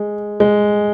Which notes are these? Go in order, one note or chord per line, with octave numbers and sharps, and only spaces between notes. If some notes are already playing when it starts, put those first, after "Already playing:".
Already playing: G#3
G#3